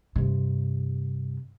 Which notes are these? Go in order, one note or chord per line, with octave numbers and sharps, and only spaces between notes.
G2 C3